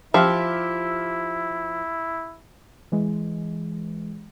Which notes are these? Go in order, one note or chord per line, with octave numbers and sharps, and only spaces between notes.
F3 E4 G4 E5 F6
E3 G#3